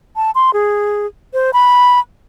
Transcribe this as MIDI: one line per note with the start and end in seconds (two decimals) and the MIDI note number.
0.16 0.31 81
0.35 0.53 84
0.53 1.06 68
1.33 1.51 72
1.53 1.99 83